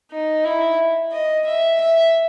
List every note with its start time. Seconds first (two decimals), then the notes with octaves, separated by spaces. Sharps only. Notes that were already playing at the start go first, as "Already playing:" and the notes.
0.11 D#4
0.45 E4
1.12 D#5
1.47 E5
1.80 E5